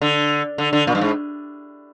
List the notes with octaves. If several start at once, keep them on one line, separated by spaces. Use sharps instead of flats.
D3
D3
D3
A#2
G2
G#2